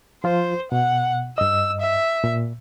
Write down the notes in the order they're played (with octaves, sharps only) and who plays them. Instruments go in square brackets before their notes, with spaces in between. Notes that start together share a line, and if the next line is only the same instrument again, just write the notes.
[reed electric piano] F3 F4 [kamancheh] C5
[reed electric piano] B2 [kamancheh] F#5
[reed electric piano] G2 D#5 [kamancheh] E6
[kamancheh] E5
[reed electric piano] A#2